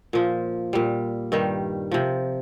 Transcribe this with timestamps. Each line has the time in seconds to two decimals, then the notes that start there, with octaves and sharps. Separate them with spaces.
0.13 A#2 F3
0.73 A#2 G3
1.32 G2 D#3 G3
1.92 C3 F3